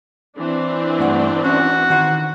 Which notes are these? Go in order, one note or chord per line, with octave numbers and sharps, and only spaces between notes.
E3 C4 D4
G2 A3 F#5
C#4 F#4
D#3 F#5 C6